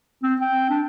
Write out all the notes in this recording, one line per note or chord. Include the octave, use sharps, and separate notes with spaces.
C4
G5
D4